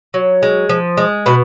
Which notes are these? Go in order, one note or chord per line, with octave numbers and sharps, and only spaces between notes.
F#3
G#3
F3
G#3
B2 B4